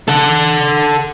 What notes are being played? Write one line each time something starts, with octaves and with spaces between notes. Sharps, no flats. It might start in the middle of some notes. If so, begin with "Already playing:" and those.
A4 F#5